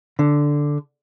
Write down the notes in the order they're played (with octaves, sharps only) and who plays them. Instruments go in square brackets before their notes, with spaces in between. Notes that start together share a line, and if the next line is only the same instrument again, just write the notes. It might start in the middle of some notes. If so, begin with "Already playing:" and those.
[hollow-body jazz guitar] D3